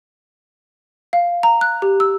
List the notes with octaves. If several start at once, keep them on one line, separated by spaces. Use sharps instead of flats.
F5
A#5
F#6
G4
E6